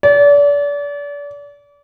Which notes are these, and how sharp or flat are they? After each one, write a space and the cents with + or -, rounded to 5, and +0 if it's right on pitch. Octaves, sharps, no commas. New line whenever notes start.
D5 -35